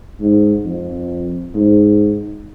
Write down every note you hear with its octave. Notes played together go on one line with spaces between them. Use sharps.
G#2
F2
G#2